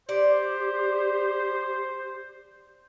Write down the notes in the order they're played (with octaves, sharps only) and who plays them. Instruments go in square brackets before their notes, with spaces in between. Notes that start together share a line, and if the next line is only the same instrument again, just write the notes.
[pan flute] G4 [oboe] C5 [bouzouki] D5